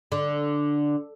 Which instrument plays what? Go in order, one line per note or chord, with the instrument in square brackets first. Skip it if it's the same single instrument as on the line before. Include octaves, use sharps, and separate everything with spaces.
[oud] D3